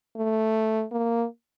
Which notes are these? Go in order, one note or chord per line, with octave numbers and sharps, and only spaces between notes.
A3
A#3